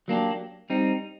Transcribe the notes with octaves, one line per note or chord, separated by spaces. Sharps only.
F#3 A#3 D4 G4
G3 C4 D#4